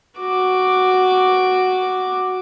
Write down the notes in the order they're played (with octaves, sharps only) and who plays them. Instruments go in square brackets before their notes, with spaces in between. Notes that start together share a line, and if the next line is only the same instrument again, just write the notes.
[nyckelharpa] F#4 D6